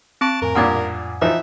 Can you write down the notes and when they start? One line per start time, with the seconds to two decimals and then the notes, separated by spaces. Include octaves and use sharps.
0.21 C4 A5 C#6 D7
0.42 F2 A2 A#4 G#5
0.55 G2 A#2 D4 F#5 D#6 G#6
1.22 E3 F3 D#4 E5